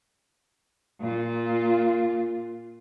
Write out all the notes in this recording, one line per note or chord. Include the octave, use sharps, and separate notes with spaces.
A#2 F4